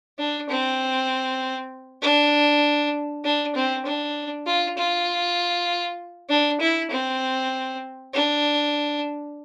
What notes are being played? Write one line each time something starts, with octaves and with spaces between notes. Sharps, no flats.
D4
C4
D4
D4
C4
D4
F4
F4
D4
E4
C4
D4